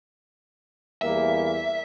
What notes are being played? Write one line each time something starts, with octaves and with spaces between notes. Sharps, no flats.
E2 G3 A#3 E5